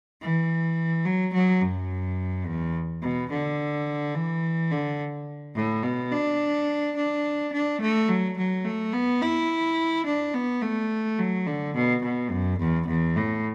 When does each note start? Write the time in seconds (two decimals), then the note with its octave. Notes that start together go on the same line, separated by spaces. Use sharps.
0.22 E3
1.05 F#3
1.34 F#3
1.61 F#2
2.46 E2
3.02 B2
3.30 D3
4.15 E3
4.71 D3
5.56 A2
5.84 B2
6.12 D4
6.96 D4
7.53 D4
7.81 A3
8.09 F#3
8.37 F#3
8.65 A3
8.93 B3
9.22 E4
10.06 D4
10.34 B3
10.62 A3
11.18 F#3
11.47 D3
11.75 B2
12.03 B2
12.31 F#2
12.59 E2
12.87 E2
13.16 A2